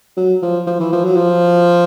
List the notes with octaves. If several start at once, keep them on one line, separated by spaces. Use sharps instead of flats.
F#3
F3
F3
E3
F3
F#3
F3